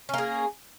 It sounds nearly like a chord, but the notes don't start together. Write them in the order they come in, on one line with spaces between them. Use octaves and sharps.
C#4 A#3 G#4